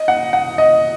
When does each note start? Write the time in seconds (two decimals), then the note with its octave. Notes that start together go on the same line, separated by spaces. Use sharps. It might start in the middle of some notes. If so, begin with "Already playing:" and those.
Already playing: D#5
0.08 F#5
0.33 F#5
0.58 D#5